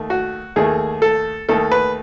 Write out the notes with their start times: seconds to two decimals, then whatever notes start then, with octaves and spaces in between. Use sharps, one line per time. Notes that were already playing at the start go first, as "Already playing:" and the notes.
Already playing: D#2 D#3 A3
0.10 F#4
0.56 D#2 D#3 A3 G#4
1.02 A4
1.49 D#2 D#3 A3 A4
1.72 B4